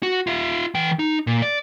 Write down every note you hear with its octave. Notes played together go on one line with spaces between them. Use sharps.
F#4
F4 E5
E3 G5
D#4
A#2
D5